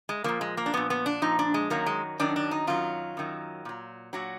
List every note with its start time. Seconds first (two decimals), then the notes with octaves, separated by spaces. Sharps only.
0.09 G#3
0.24 A#2 F3 A#3
0.41 G#3
0.57 A#3
0.66 D4
0.74 A#2 F3 B3
0.90 B3
1.06 D4
1.22 A#2 F3 D#4
1.39 D4
1.54 G#3
1.70 F#2 D#3 F#3 A#3
1.86 G#3
2.19 F#2 D#3 F#3 D4
2.36 D4
2.51 D#4
2.67 F#2 D#3 F#3 F4
3.17 F#2 D#3 F#3
3.65 A#2 F#3
4.13 A#2 F#3 F#4